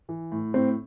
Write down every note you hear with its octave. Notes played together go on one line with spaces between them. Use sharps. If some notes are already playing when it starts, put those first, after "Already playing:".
E3
A2
A2 C4